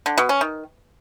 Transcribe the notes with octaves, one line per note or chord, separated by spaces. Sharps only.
D3
B2
C#4
D#3